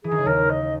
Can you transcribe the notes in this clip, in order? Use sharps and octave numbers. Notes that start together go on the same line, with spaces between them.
E3 G#4
D#3
C#3
D#2 D#3 A#4
D#5